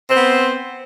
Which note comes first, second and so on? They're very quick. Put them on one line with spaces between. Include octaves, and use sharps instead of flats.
C4 C5 B3